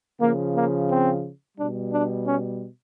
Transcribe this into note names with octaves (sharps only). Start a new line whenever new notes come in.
C#3 F3 A#3
A#3
C4
B2 G3 D4
D4
C#4